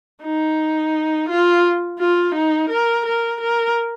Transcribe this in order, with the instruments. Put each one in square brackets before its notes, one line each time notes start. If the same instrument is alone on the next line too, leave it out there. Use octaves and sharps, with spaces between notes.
[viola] D#4
F4
F4
D#4
A#4
A#4
A#4